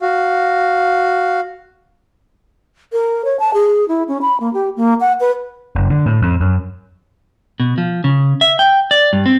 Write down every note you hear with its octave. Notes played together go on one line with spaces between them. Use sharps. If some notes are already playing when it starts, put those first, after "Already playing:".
F#4 F5
A#4
C#5
A5
G#4
E4
C#4
B5
A#3
G4
A#3
F#5
B4
F#1
D3
A2
F2
F#2
B2
F3
C#3
E5
G5
D5
G2
C4